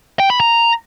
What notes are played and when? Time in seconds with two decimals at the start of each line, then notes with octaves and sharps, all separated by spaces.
0.20 G5
0.30 B5
0.40 A#5